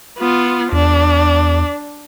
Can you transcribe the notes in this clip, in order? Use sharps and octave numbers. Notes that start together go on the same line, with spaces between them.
B3 F4
E2 D4